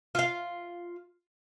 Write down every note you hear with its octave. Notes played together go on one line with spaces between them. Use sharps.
F4 F5